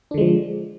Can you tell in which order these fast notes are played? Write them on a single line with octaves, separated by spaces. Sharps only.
D4 D3 G#3 F3